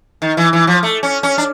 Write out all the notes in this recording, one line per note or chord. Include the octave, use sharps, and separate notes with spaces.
D#3
E3
E3
F3
A3
C#4
C#4
D4